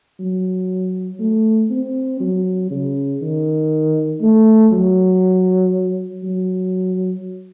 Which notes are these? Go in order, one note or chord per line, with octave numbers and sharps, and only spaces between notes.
F#3
A3
C4
F#3
C#3
D#3
A3
F#3
F#3